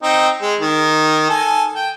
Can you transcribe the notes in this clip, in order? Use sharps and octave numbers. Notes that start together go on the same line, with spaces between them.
C4 D#4
G#3
D#3
A4 G#5
G5